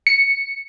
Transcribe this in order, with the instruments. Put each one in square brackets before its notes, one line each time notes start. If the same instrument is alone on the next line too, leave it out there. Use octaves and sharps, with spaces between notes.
[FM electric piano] C#7